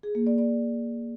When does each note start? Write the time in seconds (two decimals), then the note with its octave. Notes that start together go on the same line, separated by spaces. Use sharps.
0.03 G#4
0.15 A#3
0.27 D5
0.38 D5